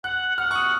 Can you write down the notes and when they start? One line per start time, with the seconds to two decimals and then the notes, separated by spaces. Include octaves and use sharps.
0.04 F#5 F#6
0.38 F#5 F6
0.51 C#6
0.55 D#6